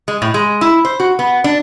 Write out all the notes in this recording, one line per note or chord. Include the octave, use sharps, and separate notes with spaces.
G#3
A2
G#3
E4
C5
F#4
B3
D4